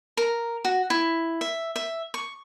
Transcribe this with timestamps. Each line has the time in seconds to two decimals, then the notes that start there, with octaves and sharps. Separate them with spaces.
0.17 A#4
0.65 F#4
0.90 E4
1.41 E5
1.76 E5
2.14 C#6